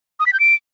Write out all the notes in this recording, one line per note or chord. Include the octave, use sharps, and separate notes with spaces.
D#6
B6
G6
D7